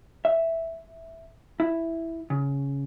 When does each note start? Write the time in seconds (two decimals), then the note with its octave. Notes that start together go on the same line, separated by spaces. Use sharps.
0.25 E5
1.60 E4
2.30 C#3